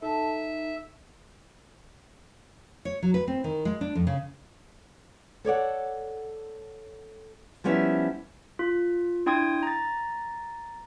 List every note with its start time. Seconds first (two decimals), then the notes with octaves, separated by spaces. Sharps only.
0.02 D#4 A4 E5
2.85 C#5
3.02 F#3
3.14 B4
3.28 C4
3.44 D#3
3.65 G#3
3.81 D4
3.95 F2
4.07 C#3
5.45 A4 C#5 D5 F#5
7.64 F3 G3 B3 C#4 E4 E5
8.59 F4
9.26 D4 E4 G5 C6 D#6 G#6
9.63 A#5 A6